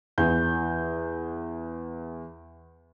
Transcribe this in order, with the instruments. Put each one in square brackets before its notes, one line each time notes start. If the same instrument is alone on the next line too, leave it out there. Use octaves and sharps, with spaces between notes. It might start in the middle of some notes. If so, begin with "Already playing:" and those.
[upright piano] E2 G6